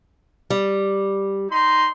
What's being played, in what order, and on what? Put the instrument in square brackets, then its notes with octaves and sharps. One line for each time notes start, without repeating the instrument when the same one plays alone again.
[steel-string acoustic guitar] G3
[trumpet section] D#4 C6